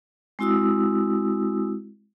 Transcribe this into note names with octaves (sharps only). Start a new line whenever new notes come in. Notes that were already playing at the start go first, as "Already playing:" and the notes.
G#3 C4 E4 F#4 D#6 E6